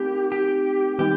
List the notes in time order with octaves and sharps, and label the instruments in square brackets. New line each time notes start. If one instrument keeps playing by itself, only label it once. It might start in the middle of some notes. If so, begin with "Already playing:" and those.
Already playing: [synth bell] A3 C4 D#4 A#4 [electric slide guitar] G4
[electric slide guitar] G4
[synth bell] D#3 G3 B3 D#4 [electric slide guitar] G4